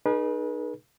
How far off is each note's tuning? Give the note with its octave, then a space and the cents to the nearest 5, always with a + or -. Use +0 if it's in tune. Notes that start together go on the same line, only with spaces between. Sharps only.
D#4 -25 G#4 +25 B4 -35